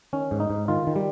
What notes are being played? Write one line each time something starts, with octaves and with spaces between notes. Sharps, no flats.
D#3 C#4
G#2
D#4
G#2
D#3 F4
D#3
G3